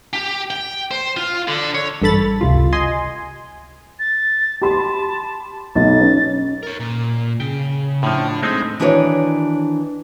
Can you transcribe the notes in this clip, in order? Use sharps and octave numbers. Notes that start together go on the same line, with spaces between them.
G4
G5
C5
F4
D3
C#5
A1 G2 A4 B5 A6
G1 C#2 C3 F4
D#5 G#5 C6
A6
G4 A5 B5 C6
B1 A6
C#4
A#4 C#5
A#2
C#3 G5
A2 D3 F3
G#3 A3 C4 D#4
D#3 E3 D4 F#4 B4 C#5